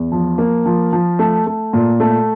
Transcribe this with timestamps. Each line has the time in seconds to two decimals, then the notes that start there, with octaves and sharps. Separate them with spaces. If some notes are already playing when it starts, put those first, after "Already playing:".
Already playing: E2
0.12 F3
0.38 A#3
0.65 F3
0.93 F3
1.19 A3
1.47 A3
1.73 A#2
2.00 A3